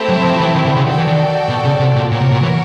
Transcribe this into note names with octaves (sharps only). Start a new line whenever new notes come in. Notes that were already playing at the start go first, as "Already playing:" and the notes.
Already playing: A3 C4 E4 G4 C5
F#3
F3
E3
D#3
D3
C#3
D#3 F#4 A4 D5 G5
E3
D#3
B2
C#3
C3
A#2
A#2 F#4 A#4 C#5
C3
A#2
E3